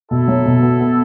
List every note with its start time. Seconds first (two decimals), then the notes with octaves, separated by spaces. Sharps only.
0.11 B2 E4 A4
0.28 F#3
0.46 B2
0.62 B3
0.79 B3